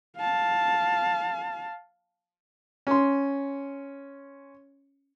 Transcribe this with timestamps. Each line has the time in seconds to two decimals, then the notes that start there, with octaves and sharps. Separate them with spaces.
0.18 F5 A5
2.87 C#4 C6